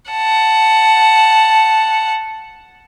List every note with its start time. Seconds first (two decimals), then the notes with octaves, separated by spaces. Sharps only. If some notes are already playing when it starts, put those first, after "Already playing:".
0.11 F#5 A5